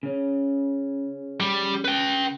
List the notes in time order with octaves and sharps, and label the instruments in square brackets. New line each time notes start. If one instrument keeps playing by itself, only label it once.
[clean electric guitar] C#3 C#4
[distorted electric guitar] G3
B4 G5